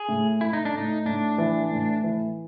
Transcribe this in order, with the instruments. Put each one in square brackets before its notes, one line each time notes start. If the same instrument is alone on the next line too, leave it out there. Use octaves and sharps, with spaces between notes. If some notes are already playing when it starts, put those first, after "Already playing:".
Already playing: [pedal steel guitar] G#4
[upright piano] A2
[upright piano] A3 [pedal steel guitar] E4
[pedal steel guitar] D#4
D4
[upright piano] A2 [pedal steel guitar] D#4
[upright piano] A2 [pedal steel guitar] D4
[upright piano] E3
A2
E3